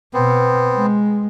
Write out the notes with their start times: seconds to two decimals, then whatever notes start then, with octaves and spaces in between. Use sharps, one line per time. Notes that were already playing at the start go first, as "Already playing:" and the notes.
0.14 B2 B3 C4
0.74 G#3